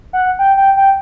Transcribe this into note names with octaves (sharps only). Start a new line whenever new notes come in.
F#5
G5
G5
G5